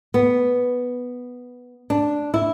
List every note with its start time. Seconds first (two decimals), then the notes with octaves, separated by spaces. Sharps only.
0.14 B3
1.90 D4
2.34 E4